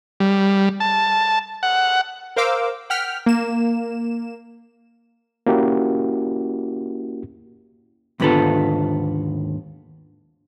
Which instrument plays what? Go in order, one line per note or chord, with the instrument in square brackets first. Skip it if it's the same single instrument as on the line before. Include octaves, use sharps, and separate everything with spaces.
[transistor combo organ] G3
A5
F#5
[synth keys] A#4 C5 F5 D6 E6
F#5 G5 F6 B6
A#3 E7
[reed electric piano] A#3 C#4 E4 F#4 G4
[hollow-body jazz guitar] D#2 G#2 D3 B3 F4 A4